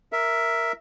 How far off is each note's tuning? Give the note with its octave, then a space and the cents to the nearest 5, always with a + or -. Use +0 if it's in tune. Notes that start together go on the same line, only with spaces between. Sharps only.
A#4 -5 E5 +0